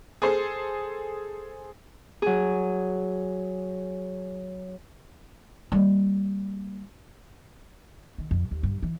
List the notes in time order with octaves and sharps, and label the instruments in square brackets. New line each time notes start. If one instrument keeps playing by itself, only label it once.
[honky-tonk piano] G#4 A4 C5
[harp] F#3 G#4
[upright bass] G3 A#3
D#3
F2
D#2
G2
E3